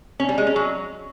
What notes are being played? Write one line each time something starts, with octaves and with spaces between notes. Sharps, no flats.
C#4
G3
G#3
C#4
F#3